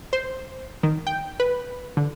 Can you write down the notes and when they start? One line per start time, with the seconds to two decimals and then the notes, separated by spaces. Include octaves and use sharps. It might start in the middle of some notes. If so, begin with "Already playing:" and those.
0.13 C5
0.83 D#3
1.07 G5
1.40 B4
1.97 D3